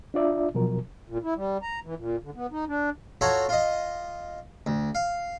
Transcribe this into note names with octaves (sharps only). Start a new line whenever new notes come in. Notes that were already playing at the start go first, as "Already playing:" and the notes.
D4 F4 D5 E5
B2 F3 F#3 A#4
A#2
E4
G3
A#5
E3
A#2
D3
B3
D#4
D4
F4 F#4 A4 C#5 A#5
F4 D#5
D2
F5